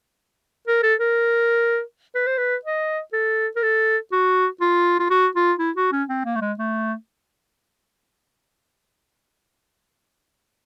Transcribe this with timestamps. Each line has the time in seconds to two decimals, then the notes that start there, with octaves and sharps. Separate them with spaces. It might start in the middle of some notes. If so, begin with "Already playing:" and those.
0.67 A#4
0.83 A4
1.00 A#4
2.15 B4
2.27 C5
2.38 B4
2.65 D#5
3.13 A4
3.56 A#4
3.63 A4
4.12 F#4
4.61 F4
5.00 F4
5.10 F#4
5.36 F4
5.59 E4
5.76 F#4
5.92 C#4
6.09 C4
6.25 A#3
6.35 A3
6.41 G#3
6.59 A3